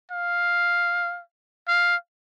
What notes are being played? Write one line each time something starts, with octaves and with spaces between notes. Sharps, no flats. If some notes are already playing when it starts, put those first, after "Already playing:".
F5
F5